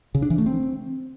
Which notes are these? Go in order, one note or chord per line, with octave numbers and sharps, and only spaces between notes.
C#3
D4
E3
A3
C4